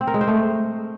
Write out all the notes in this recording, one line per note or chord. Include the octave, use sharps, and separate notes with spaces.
C4
A#4
G#3
C5
A3